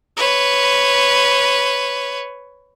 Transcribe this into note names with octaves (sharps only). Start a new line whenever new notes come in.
B4 C#5